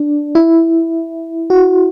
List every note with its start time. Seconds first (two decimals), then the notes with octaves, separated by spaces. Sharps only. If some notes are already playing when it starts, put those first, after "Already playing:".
Already playing: D4
0.35 E4
1.50 F#4